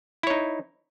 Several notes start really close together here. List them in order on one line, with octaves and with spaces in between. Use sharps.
E4 C#5 D#4